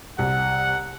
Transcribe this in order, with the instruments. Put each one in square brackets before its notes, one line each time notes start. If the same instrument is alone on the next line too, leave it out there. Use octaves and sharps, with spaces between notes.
[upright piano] C2 [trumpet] F#5